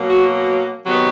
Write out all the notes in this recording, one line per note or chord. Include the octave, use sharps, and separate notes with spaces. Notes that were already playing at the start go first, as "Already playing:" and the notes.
Already playing: B2 F#3 A#3
F#4
C3 D#3 F#3 B3